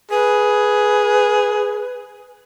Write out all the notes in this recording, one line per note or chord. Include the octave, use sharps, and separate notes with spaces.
G#4 B4